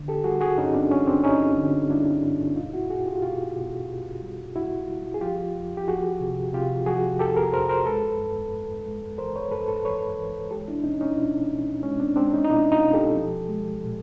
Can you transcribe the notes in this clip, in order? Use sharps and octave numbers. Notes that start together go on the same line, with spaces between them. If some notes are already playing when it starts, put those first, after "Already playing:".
Already playing: D3
G4 A4
G3 F#4 G#4
F#4 G#4
G2 C#4 D#4
C4 D4
G3 C#4
C4 D4
G2 C#4 D#4
D3
G3 D4 E4
G2
B2 D#4 F4
E4 F#4
B2 F#4 G#4
F4 G4
F#4
B2 F4 G4
B2
B2
G3
G3 E4 F#4
G3
G#4
F3 F4 G4
F2
G4
F3 F#4 G#4
C3
C3 F4 G4
F3 F#4 G#4
F2 G4 A4
G#4 A#4
F2 A#4 C5
A#4 C5
G#3 A4 B4
G2
G2
G#3
E3 A#4 C5
B4 C#5
G2 A4 B4
A4 B4
E3 B4 C#5
E3
G#3 G4 A4
D4 E4
B2 C#4 D#4
C#4 D#4
B2 D4 E4
B2
G#3 C#4
C4 D4
G#3 C4 D4
C#4 D#4
D#4
B2 D4 E4
D#4 F4
B2
G4 A4
F3
G#3
A#2